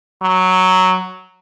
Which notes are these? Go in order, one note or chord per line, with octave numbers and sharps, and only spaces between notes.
F#3